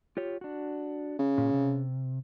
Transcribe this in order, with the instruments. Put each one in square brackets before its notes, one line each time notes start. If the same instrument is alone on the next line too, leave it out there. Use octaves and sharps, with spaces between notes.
[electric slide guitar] F4 G4 C#5
D4 F#4
[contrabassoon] C#3
[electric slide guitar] A#2
C3